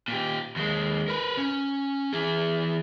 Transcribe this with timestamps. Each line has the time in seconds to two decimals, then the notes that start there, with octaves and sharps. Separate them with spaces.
0.08 A#2 G4
0.56 D#2 G#3
1.08 A#4 B4
1.37 C#4
2.13 E3 G#4